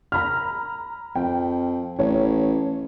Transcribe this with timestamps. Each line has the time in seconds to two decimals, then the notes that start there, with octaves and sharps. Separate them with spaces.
0.12 A#5 B5 F6
1.15 F2 G5
1.99 A1 C#5